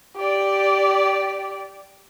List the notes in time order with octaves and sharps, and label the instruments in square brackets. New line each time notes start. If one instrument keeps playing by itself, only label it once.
[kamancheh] G4 D5